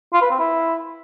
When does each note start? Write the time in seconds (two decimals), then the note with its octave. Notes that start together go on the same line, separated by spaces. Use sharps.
0.13 F4
0.22 B4
0.31 C4
0.40 E4